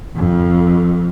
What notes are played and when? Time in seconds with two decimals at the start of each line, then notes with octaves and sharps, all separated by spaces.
0.16 F2